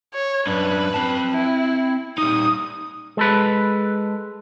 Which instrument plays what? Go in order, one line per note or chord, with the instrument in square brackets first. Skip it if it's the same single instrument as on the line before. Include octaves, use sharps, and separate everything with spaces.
[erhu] C#5
[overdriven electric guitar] F#2 D4 [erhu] B4
[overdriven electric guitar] C4 A5
[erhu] E4
[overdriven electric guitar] G3 D#4 [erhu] D#6
[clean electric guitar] G#3 A4 B4